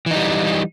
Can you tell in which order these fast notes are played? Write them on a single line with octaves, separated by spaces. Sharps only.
E3 D#4 G3